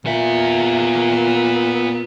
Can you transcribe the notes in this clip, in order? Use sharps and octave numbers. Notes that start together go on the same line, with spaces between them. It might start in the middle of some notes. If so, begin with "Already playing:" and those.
A#2 B3 E5